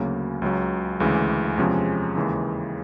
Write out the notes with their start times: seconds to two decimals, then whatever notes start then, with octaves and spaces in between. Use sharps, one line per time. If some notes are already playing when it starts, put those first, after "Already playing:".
Already playing: D2 C#3 F#3 A#3
0.42 C#2 C#3 F#3
1.00 D2 C#3 E3 G#3
1.58 E2 C3 F3 G#3 C#4
2.16 D#2 C#3 E3 G#3